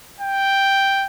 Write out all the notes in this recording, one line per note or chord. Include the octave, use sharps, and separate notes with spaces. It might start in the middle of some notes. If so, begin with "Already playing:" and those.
G5